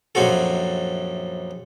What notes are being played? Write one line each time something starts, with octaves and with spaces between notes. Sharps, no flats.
A#1 F#2 C4 F#4 A4